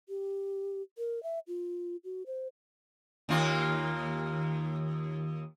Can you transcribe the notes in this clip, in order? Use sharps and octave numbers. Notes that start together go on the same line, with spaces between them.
G4
A#4
E5
F4
F#4
C5
D#2 A#3 F4